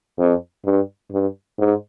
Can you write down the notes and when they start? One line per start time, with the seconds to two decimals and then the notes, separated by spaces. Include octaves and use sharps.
0.18 F2
0.64 G2
1.11 G2
1.58 G#2